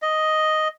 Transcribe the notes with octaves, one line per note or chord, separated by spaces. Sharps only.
D#5